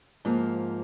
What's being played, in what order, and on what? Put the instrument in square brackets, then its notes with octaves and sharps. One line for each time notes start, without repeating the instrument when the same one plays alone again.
[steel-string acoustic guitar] G#2 F3 A#3